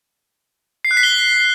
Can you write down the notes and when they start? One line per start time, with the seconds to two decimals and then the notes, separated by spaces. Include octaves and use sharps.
0.85 C7
0.91 F#6
0.97 B6
1.03 G7